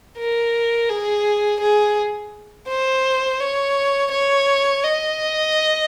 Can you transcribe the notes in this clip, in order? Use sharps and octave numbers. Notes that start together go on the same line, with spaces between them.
A#4
G#4
G#4
C5
C#5
C#5
D#5